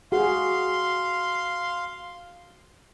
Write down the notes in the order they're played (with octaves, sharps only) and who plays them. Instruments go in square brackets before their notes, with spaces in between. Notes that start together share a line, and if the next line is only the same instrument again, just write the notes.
[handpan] F#4 G#4 [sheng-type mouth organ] F5 C6